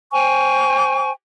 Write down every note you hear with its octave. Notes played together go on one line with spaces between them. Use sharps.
C5 G5 G#5 C#6